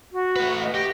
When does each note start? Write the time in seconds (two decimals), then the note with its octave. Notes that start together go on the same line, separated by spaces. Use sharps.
0.13 F#4
0.36 A3 B4
0.63 D#5
0.75 G4 A#6